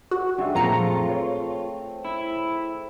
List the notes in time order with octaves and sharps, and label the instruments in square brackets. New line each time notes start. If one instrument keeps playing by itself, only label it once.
[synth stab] F#4
[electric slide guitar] G2 [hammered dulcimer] G#3 [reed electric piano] D4 G4 E5
[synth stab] F#2 A#5 C#7 [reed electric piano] A#2 F3 [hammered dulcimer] A3 C4 [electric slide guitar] F4
[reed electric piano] B4 C#5
[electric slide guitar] E4